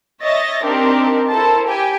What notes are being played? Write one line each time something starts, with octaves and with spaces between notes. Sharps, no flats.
C#5 D#5 E5 A6 A#6
C4 D4 D#4 G4 A#4
E4 A4 A#4 C5 A5
G4 G5 G#5